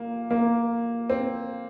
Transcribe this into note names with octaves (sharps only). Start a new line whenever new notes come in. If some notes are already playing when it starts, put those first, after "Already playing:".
Already playing: A#2 A#3
A#3
C4